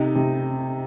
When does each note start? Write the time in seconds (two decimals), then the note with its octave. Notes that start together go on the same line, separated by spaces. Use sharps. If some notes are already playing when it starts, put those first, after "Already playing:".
Already playing: C3 D#4
0.15 C3